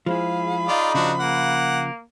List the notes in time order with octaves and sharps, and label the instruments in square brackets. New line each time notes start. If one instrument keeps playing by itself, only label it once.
[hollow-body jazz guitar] F3 G#3 E4 [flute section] G#4 F5 B5
[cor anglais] D#4 [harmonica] F4 D5
[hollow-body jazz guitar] C#3 F3 [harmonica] D4 F#4
[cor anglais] A#3 [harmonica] F#5